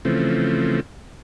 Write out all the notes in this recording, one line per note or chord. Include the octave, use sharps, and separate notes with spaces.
C#3 E3 F3 A3 C4